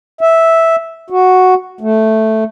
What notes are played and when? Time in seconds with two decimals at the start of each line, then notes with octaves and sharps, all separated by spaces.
0.21 E5
1.10 F#4
1.81 A3